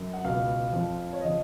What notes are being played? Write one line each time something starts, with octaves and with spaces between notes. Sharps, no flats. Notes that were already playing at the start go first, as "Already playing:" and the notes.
Already playing: F#2
F#5
C#2 B2 F5
F2 F3
C#5
C#3 F3 D#5